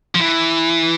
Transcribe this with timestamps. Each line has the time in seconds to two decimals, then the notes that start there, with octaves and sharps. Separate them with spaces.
0.15 F3
0.20 E3